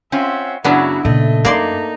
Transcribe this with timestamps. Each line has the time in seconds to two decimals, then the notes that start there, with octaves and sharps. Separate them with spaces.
0.12 C4 C#4 F4 E5 F#5
0.64 F#2 C#3 F#3 B3 D4 E4 F#4
1.05 A#2 C#3 A3 D#5
1.45 F#2 A#3 D#4 D5 C6